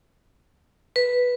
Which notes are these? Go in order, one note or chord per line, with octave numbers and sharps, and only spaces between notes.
B4